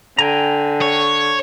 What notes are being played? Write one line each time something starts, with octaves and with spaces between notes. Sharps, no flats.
D3 G5 G#5 A#5
C#5